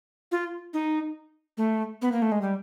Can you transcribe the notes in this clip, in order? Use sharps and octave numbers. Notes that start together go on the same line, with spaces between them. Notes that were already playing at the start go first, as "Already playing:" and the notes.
F4
D#4
A3
B3
A#3
A3
G#3
G3